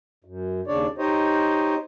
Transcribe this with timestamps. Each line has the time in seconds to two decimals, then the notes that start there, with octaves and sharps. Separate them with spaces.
0.24 F#2
0.67 D#2 C#3 D4 C#5 D5
0.98 D#4 G4 C5 C#5 D#5